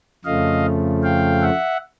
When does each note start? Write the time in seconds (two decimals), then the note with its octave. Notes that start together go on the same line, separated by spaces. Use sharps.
0.25 F2 C#3 F3 A3 D#5 F5
1.03 F5 G5
1.42 E5 F#5